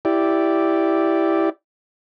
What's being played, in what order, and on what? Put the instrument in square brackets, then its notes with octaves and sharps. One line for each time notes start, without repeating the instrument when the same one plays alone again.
[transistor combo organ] E4 G4 D5